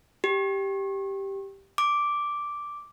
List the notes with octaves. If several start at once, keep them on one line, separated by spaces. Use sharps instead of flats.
G4
D6